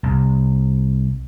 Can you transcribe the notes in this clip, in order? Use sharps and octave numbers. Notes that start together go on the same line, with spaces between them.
C2